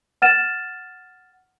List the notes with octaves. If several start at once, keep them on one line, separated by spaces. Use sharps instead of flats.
F#5 F6 A6 D#7 E7